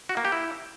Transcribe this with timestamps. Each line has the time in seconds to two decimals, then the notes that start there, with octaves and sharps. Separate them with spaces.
0.09 F#4
0.17 A#3
0.25 G4
0.32 E4